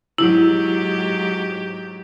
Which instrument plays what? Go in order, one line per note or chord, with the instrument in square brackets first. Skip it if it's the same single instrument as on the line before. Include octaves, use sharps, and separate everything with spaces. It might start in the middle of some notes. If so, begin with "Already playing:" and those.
[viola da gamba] G#2 F#3 G4 [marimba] E4